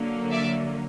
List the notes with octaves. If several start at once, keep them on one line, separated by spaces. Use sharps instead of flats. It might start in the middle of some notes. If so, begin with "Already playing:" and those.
Already playing: D3 F#3 A#3
D5 E5